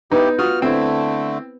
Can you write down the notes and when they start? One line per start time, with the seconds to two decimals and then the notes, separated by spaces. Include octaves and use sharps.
0.11 B3 D#4 E4 G4 G6
0.39 F4 F#4 D#6 F6
0.62 D3 A3 C4 E4